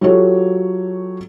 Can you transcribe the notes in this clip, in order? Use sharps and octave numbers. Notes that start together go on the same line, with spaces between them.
F#3 F4 G4 A4 C#5